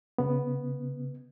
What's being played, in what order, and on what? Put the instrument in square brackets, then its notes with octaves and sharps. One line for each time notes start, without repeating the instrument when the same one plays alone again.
[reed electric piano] C#3 B3